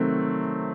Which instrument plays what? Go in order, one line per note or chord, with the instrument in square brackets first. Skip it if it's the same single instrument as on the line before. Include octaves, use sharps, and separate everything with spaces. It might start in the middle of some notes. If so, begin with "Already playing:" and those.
Already playing: [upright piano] C3 D#3 F#3 A3 C4